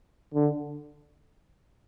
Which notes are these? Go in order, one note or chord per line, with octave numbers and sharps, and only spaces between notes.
D3